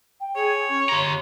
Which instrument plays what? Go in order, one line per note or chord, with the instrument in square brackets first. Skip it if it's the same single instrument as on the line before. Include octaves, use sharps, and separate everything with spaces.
[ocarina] G5
[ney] G#4 [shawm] C#5
[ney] C#4 [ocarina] C#6
[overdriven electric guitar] G4 A#5 [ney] C6